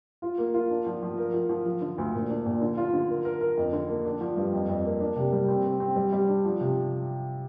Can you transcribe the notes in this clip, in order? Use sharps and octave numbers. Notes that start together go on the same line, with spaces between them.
F4
A#3
F4
D4
F3
F3
A#4
F3
F3
F3
D3
D2
A#2
D4
A#2
D3
F4
D3
A#4
A#4
A#4
F2
D3
A#3
D4
F3
G2
F2
F2
A#3
D4
C3
G3
C4
C4
C4
G3
G3
D4
F3
C3